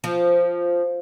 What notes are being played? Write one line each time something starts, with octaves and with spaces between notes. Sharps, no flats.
F3